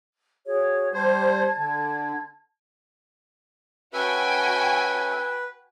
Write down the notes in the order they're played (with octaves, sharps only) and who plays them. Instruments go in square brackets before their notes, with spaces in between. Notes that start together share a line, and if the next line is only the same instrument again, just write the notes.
[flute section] F#4 G#4 C#5
[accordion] G3 C5 [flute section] A5 G#6
[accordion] D3
[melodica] C#4 A4 E5 [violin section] F#4 G5 G#5 [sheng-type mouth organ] B4